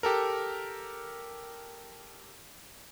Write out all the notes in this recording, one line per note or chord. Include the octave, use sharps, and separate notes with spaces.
G4 A4 A#4